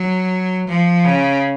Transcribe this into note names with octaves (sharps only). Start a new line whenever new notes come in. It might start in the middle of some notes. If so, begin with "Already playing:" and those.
Already playing: F#3
F3
C#3